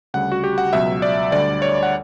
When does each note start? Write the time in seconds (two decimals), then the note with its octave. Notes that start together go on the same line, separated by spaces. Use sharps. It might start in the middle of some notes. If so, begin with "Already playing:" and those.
0.14 D2 C#3 G3 F#5
0.32 F#4
0.44 G4
0.58 F#5
0.73 C#2 B2 F#3 E5
1.02 D5
1.32 D2 D3 G3 D5
1.62 C#5
1.83 F#5